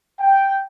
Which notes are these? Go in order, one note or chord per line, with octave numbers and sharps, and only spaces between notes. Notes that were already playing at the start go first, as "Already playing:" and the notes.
G5